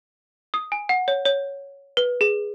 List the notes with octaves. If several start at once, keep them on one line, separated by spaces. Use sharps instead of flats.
D#6
G#5
F#5
C#5
C#5
B4
G#4